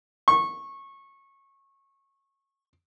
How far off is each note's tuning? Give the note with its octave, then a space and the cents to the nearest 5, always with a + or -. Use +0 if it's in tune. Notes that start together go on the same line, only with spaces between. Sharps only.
C#6 -20